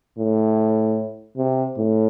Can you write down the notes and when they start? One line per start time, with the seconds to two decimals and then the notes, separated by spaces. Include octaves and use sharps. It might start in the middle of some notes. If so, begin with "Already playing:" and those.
0.19 A2
1.38 C3
1.78 A2